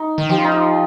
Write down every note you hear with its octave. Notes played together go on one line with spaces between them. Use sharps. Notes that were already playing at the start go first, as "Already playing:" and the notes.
Already playing: D#4
D#3
F3 G4
F4
D#4
F4